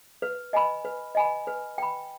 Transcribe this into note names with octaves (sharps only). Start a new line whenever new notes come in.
B4
D#5 G#5 B5
B4
D#5 G#5 B5
B4
G5 B5